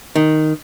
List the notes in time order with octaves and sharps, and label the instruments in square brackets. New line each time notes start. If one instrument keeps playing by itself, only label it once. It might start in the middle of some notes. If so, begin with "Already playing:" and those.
[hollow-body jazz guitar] D#3